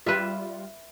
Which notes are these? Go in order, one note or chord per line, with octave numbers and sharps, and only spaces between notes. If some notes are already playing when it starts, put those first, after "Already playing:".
G3 F4 B4 E5